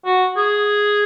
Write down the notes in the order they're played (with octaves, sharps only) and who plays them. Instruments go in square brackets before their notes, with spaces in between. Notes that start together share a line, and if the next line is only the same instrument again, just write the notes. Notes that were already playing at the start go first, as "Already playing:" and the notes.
[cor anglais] F#4
G#4